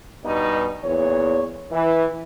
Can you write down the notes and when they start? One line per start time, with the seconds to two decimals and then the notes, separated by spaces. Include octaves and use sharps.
0.24 G2 B2 G3 B3 D#4
0.84 E2 A#2 C#5
1.72 E3